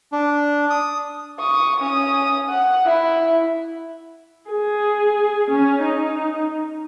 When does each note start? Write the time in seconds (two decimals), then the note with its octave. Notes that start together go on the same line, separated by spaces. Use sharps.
0.12 D4
0.70 D#6
1.40 C#6 D#6
1.80 C#4 D#6
2.50 F#5
2.86 E4
4.51 G#4
5.51 C#4
5.83 D#4